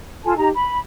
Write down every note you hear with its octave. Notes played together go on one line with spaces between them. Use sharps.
F4 A4 G#5 A5
D#4 G4 A#5
B5